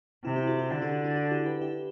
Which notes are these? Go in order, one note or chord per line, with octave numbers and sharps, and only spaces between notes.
C3 E4
E4 G4
F#4 A4
E4 G4
D3 E4
D4 F#4
E4
D4
D4 F#4
E4 G4
G4 B4
E4 G4